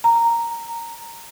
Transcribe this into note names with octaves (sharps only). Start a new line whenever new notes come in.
A#5